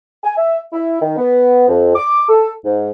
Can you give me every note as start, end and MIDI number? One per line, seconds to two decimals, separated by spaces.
0.24 0.33 80
0.37 0.59 76
0.73 1.00 64
1.01 1.17 51
1.17 1.68 59
1.68 1.93 41
1.95 2.23 86
2.29 2.51 69
2.65 2.91 44